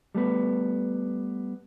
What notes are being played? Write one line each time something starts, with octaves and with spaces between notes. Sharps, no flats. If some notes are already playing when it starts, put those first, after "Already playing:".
G3 A3 B3 B4